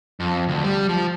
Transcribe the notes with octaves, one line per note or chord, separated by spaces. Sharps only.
F2
D2
G3
F3